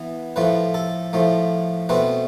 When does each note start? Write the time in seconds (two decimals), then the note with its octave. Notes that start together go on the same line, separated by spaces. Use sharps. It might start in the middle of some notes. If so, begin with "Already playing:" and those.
Already playing: E3 B3
0.36 A2 F3 A3 B4
0.74 A4
1.13 A2 F3 A3
1.89 B2 A3 C4 B4